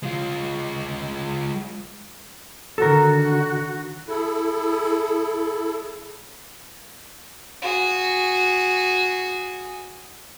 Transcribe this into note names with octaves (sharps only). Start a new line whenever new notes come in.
G#3 F4
D3 D#3 F#4 A4 A#4
E4 G#4 A4
F#4 G#4